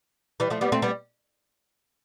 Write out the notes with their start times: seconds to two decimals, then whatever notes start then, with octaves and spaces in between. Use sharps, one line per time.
0.40 E3 G3
0.50 F3 A3
0.61 G3 B3
0.72 A3 C4
0.82 G3 B3